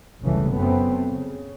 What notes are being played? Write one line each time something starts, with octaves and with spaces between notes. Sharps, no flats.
F1 C#2 C#3 E3 G3 A3
F#2 C#3 A3 B3 C4
C#3